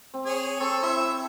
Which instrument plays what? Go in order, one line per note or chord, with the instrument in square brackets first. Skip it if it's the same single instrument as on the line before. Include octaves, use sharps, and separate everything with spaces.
[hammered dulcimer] C4
[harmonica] G#4 C#5 G#5
[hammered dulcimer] C4 [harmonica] A4 C#6 E6
[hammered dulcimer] E4 [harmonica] E5
[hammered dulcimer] A5